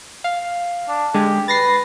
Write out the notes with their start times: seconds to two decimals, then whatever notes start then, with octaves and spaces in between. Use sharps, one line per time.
0.24 F5
0.89 D4
1.14 D3 G#3 G4
1.48 B4 A6 A#6 C7